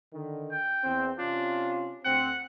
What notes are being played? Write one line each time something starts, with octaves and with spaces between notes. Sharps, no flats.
D3 D#3
G5
E2 C4
C3 C#4 D4 F4
D2 C4 F#5